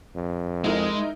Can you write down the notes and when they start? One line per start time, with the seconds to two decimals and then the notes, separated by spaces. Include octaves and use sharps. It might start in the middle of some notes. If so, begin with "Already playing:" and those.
0.16 F2
0.64 G#3 D#4 E4 A#4